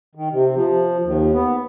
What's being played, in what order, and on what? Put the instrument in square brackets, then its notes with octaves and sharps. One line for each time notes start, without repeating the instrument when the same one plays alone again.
[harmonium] D#3
C3
F3
D#2
B3